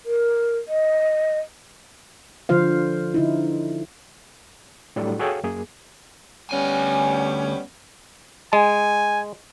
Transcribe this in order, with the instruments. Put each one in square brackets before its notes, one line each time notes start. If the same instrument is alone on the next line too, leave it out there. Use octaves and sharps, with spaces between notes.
[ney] A#4
D#5
[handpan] D3 F3 F4 C5 F5
D3 D#4 E4
[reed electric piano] A2 F#3 G3 D4 A4
F#4 G#4 A4 C#5 F5 G5
F#2 A#3 G#4
[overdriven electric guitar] D2 G#5 [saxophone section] G3 B3 C#4
[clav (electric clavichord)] G#3 [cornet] G#5